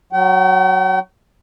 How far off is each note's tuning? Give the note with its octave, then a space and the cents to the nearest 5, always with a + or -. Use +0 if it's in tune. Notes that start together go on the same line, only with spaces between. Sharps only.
F#3 +0 G5 -45